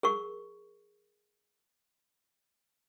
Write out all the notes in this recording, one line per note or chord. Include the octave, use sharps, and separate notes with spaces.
G#4 A#4 C#6